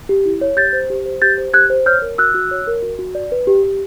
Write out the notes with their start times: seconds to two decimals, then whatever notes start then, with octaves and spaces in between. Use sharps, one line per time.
0.09 G4
0.25 E4
0.41 C#5
0.57 G4 G6 A6
0.73 C5
0.90 G4
1.06 C5
1.22 G4 G6 A6
1.38 C5
1.53 G4 F#6 G#6
1.70 C5
1.86 C#5 F6 G6
2.02 A#4
2.18 F#4 E6 F#6
2.35 F#4
2.51 C#5
2.67 A#4
2.82 F#4
2.99 F#4
3.15 D5
3.32 B4
3.47 G4
3.63 G4